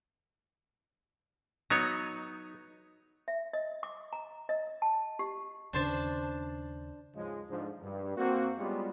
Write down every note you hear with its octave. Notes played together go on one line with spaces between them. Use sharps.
F#3 B3 D#4 C#5
E5
D#5
D6
A#5
D#5
A5
G4
D#2 C#3 D4 C5 A5
G#2 C#3 F3 G#3
G#2 D3 F3
G2
A#3 C4 F#4
G3 G#3 B3 C#4 F4 G4